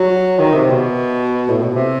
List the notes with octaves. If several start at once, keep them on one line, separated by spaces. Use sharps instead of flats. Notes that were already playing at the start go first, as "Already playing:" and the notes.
Already playing: F#3
D#3
C3
B2
A2
B2
C3